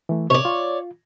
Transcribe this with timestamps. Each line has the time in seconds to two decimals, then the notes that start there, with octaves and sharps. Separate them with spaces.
0.09 E3 A3
0.30 C3 C#5 D5
0.45 F4